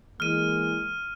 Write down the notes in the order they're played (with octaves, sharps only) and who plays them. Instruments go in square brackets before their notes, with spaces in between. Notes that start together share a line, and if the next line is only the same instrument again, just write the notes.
[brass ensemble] E3 G#3 A#3 [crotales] F6 D#7